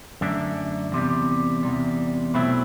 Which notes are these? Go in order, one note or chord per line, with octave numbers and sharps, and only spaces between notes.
F#2 D3 A3 D4
E2 C3 G3
E2 C3 G3
B2 F#3 A3 C4 E4